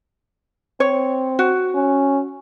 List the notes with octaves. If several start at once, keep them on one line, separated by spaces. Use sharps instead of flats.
C4 C#5
F#4
C#4